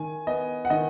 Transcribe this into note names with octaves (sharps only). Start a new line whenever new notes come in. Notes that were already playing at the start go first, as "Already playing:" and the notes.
Already playing: D#3 G#5
B3 D#5
F#5
D#3 D#5